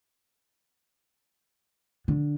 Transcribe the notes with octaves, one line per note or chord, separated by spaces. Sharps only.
D3